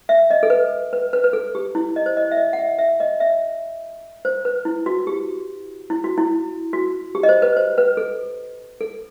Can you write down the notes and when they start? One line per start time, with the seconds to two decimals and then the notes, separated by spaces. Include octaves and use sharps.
0.09 E5
0.31 D#5
0.43 A4
0.50 B4
0.93 B4
1.13 B4
1.24 B4
1.33 A4
1.55 G4
1.75 E4
1.96 D#5
2.06 C5
2.17 D#5
2.32 E5
2.37 D#5
2.53 F#5
2.59 E5
2.79 E5
3.00 D#5
3.20 E5
4.25 C5
4.45 B4
4.65 E4
4.86 F#4
5.07 G4
5.90 E4
6.04 F#4
6.18 E4
6.73 F#4
7.15 G4
7.23 D#5
7.29 C5
7.42 B4
7.57 C5
7.78 B4
7.97 A4
8.81 A4